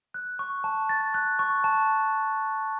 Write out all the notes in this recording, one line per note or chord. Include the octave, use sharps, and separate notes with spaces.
F#6
C#6
A5
A6
F#6
C#6
A5